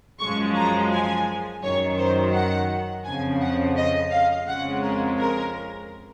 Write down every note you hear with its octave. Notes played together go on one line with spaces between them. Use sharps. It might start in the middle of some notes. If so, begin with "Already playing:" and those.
F#2 F3 G#3 C#6
A#5
G#5
F#2 D#3 F#3 C#5
C5
F#5
F2 C#3 F3 G#5
F#5
D#5
F5
F2 C#3 G#3 F#5
A#4
A#4